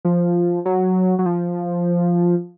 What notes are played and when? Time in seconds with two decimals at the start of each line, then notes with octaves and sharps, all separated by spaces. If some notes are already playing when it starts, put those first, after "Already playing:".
0.05 F3
0.65 F#3
1.19 F#3
1.26 F3